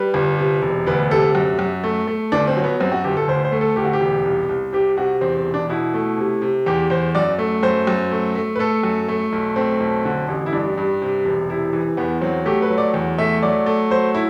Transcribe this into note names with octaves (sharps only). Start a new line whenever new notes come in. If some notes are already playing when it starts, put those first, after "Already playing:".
Already playing: G3 B4
G1
C3
E1
D2 B4
C3 A4
F#2
F#2
A3
A3
G1 D4
C4
F#3
B3
F#2 C4
F#4
G1 G4
A4
D2 C5
C5
A3
A4
D2 G4
F#4
G4
E1
C2
C2
C3 G4
C3 F#4
E2 C4
C4
E1
D4
B2 E4
A3
C3
C3
E2 G4
E2 C5
F#2 D5
A3
F#2 C5
F#2
A3
A3
B4
A3 A4
F#2
A3
B1
A3 C4
B1
D3
A1
E4
G2 D4
G2
C3
E1
C3 E4
E3
E2 B3
F#3 C4
A3 G4
B4
F#3
D5
E2
A3 E5
F#3 D5
A3
F#3 C5
E4